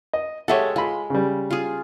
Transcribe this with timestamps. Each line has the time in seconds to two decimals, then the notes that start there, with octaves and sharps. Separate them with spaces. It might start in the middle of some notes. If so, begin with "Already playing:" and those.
0.13 D#5
0.48 G#3 G4 A4 C#5 E5 F#5
0.76 G#3 F4 B5
1.10 C#3 G3
1.51 F4 G#4